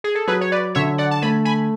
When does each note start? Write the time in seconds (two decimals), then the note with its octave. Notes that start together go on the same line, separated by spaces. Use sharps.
0.04 G#4
0.15 A4
0.27 F#3 G#4 B4
0.41 C#5
0.52 B4 D5
0.75 D3 C#5 E5
0.98 D5 F#5
1.11 A5
1.22 A3 G#5 B5
1.45 G#5 B5